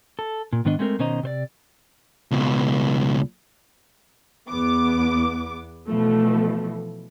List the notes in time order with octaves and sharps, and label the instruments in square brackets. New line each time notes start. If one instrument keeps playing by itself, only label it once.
[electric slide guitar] A4
A#2
G#2 D#3 B3 D4 D#5
G#3 A3 C4 F4 A#4
B2 D#3 C#4 C5 D#5 A#5
C3 C5 D5
[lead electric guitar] C#2 B2
[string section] E2 B3 D6
B2 E3 F3 A3